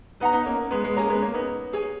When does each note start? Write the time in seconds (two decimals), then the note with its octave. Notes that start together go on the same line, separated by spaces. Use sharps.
0.20 B3 D#4 B4 F#5 A#5
0.33 B3 D#4
0.46 A#3 C#4
0.71 G#3 B3
0.84 G#3 B3
0.96 A#3 C#4 G#4 D#5 A#5
1.09 G#3 B3
1.22 A#3 C#4
1.34 B3 D#4
1.73 G#4 C#5 G#5